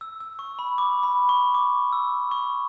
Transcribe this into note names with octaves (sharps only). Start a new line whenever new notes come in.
E6
E6
C#6
B5
D6
B5
C#6
D6
E6
C#6